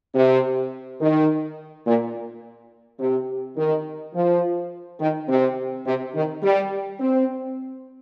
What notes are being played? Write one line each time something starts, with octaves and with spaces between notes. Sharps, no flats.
C3
D#3
A#2
C3
D#3
F3
D#3
C3
C3
D#3
G3
C4